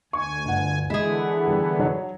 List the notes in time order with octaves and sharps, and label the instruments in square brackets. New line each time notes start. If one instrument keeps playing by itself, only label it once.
[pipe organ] D2 G#5 [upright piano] C#6
[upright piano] G1 F#5
[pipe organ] D3 E3 B3 [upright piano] G#3 [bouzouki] E4 G#4
[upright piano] G3
F#3 C#5